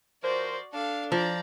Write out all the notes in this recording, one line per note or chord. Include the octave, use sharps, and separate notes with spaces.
F3 F#4 A#4 C5 D5
D4 A4 F5
F3 D5 A#5